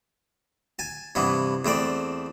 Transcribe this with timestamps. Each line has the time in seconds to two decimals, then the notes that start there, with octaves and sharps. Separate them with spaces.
0.79 G#5 A5
1.15 G2 C3 E3 B3
1.65 E2 A3 C4 D5